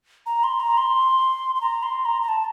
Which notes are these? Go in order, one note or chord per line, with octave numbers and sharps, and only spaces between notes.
A#5
C6
A#5
C6
C6
A#5
C6
A#5
A#5
A5